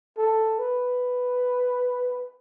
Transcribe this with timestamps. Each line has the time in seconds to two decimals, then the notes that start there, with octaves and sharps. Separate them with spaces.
0.18 A4
0.59 B4